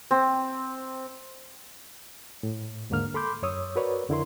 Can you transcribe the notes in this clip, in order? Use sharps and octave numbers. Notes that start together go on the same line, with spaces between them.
C4
A2
D#2 G#2 D3 A#3 F6
A4 B5 C6 D6 G6
F#2 C#5 D#6 E6
F#4 A#4 B4 C#5 D5
F2 D3 E4 A#4 C6